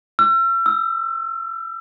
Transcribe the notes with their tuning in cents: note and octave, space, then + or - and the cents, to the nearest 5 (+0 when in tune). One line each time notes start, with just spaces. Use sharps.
E6 +40
E6 -15